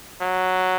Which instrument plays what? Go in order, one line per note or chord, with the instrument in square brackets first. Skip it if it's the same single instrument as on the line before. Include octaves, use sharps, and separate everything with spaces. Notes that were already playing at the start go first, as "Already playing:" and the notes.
[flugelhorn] F#3